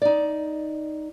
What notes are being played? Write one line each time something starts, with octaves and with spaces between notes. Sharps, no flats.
D#4 D5